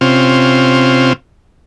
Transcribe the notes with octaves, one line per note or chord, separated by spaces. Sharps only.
C3 C4 C#4 F4